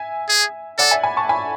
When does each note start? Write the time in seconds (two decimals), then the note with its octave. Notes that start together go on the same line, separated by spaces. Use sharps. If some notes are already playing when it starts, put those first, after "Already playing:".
Already playing: E5 G#5
0.29 G#4
0.78 A4 D5 F#5
0.91 E5 G#5
1.03 G#5 B5
1.17 A5 C#6
1.29 G#5 B5